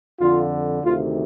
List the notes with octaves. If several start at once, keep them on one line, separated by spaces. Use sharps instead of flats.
F2 D3 F4
D2 C3 D#3 F4